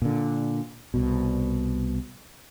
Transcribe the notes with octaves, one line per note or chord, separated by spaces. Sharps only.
A#2 D3
C2 B2